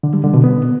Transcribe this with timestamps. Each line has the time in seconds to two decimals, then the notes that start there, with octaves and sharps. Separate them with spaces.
0.03 D3
0.14 G3
0.24 D3
0.34 B2
0.44 B3